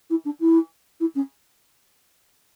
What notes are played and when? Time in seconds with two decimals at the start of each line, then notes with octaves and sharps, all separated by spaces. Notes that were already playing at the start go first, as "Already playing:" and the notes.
0.10 E4
0.25 D4
0.40 E4
1.00 E4
1.15 C#4